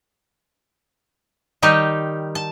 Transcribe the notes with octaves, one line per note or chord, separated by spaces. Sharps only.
D#3 G3 D#4 G4
A5